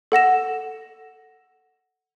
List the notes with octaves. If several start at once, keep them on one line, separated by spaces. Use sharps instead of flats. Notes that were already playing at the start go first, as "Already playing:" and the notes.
A4 F#5 A#6 E7